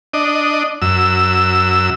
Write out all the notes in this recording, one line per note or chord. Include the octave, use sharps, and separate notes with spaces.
D4 D#5
F#2 E6